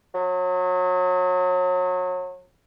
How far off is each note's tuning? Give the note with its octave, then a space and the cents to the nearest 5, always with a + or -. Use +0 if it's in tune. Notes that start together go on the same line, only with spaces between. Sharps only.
F#3 -30